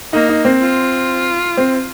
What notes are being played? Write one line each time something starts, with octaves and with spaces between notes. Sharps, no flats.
A#3 D#4
D#4
C4
F4
C4